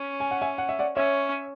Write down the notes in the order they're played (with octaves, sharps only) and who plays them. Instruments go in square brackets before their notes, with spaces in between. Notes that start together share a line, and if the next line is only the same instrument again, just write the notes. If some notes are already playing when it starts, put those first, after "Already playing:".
Already playing: [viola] C#4
[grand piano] G#5
F#5
E5 G#5
F#5
E5
D5 F#5
[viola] C#4 [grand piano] C#5 E5